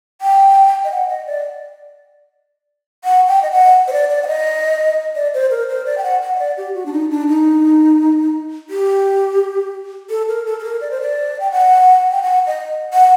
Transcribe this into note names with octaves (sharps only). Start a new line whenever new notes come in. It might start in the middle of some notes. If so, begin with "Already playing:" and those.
G5
D#5
F#5
D#5
D5
F#5
G5
D#5
F#5
C5
D5
D5
F#5
D#5
D5
C5
A#4
C5
D5
G5
F#5
F#5
D#5
D5
G4
F#4
D4
D#4
D4
D#4
G4
A4
A#4
A4
A4
A#4
D5
C5
D5
G5
F#5
G5
F#5
D#5
F#5